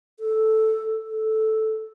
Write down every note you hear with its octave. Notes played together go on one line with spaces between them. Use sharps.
A4
A4